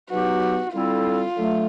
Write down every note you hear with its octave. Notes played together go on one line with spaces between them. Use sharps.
B2 F#3 B3 D#4 F#4 G4
D3 G3 C4 E4 F4 A4
D3 F#3 A3